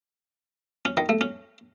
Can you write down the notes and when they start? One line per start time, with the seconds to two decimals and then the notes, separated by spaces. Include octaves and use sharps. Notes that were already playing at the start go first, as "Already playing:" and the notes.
0.85 C#4
0.97 D#3
1.09 A3
1.21 C#4